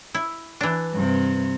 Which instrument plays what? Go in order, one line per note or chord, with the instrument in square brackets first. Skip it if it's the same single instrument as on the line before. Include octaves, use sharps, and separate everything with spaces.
[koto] E4
E3 D4
[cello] G2 C3